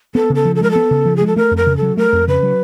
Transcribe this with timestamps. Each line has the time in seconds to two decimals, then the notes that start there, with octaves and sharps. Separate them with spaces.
0.15 B3 A4
0.30 C#3
0.35 A4
0.45 F3
0.55 A4
0.61 G#3 A#4
0.71 B3 A4
0.91 C#3
1.06 F3
1.16 G#3 G#4
1.27 A4
1.36 A3 A#4
1.51 F2
1.57 A#4
1.67 C#3
1.77 A4
1.82 F#3
1.97 A3 A#4
2.13 F2
2.28 C#3 B4
2.43 F#3